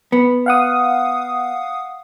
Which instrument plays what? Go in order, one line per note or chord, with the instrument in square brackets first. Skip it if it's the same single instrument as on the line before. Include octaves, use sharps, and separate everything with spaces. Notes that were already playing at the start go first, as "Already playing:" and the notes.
[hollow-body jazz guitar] B3
[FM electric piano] F5 F#5 D#6